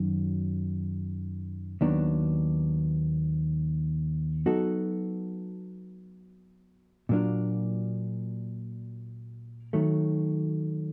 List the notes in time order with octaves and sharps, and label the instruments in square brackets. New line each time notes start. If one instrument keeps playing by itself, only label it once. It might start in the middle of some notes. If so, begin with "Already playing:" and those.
Already playing: [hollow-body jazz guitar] F#2 D#3 F#3
D#2 D#3 F#3 B3 D4
F#3 B3 D#4 F#4 A4
A#2 F#3 A#3 D4 F4
D#3 F#3 A3